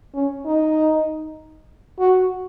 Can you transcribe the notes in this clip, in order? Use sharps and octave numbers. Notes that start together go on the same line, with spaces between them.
C#4
D#4
F#4